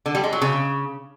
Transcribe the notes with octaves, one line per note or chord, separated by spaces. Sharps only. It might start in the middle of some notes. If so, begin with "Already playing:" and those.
D3
G3
G#3
F#3
C#3